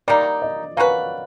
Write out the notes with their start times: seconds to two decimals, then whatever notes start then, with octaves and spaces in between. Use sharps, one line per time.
0.08 G3 A#3 D#4 D5
0.42 D#5
0.77 A#3 C#4 F#4 B4 F5